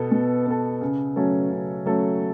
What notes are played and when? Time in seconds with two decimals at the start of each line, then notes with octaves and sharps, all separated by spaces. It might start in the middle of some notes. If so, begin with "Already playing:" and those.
Already playing: B2 B3 A4
0.12 B2
0.46 B3 A4
0.81 C#3
1.16 F#3 A3 C#4 A4
1.51 C#3
1.86 F#3 A3 C#4 A4